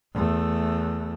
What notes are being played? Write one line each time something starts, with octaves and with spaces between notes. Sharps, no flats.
E2 A3